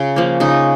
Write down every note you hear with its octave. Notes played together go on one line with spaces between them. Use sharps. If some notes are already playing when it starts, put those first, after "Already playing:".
Already playing: C#3 F4
F3 A#3
C#3 D#4